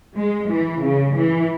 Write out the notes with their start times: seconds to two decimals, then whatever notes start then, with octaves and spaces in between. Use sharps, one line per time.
0.16 G#3
0.49 E3
0.82 C#3
1.16 E3